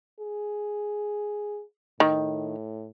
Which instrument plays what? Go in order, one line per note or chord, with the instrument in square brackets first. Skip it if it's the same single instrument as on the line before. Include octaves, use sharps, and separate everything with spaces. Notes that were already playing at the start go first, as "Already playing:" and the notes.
[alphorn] G#4
[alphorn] A2 [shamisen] D#3